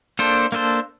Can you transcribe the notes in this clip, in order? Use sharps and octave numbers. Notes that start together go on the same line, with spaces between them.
A#3 D4 A4 C5
A#3 D4 A4 C5